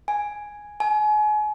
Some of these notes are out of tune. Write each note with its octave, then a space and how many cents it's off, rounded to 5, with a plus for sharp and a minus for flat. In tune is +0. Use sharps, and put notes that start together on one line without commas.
G#5 +0
G#5 +35